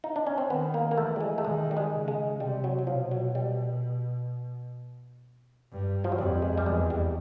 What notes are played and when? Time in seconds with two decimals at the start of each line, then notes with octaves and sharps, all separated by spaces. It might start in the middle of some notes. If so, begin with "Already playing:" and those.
0.04 D#4
0.16 D4
0.27 C#4
0.38 C4
0.50 D#3 B3
0.74 A#3
0.91 A#3
0.97 E3 A3
1.16 G3
1.21 G#3
1.38 A3
1.45 D#3 G#3
1.71 G3
1.77 G#3
1.92 C#3
2.08 G#3
2.40 C3 G3
2.64 F#3
2.79 F#3
2.87 B2 F3
3.11 F#3
3.35 G3
5.72 G2
6.04 F3
6.12 F#3
6.18 F2 G3
6.42 G#3
6.57 G3
6.66 E2 G#3
6.90 G3